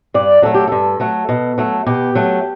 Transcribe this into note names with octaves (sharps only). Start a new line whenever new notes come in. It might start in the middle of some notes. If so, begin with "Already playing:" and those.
G2 D5
F#3 A3 A4
G4
G2 A4
F#3 A3
B2
F#3 A3
B2 G4
F#3 A3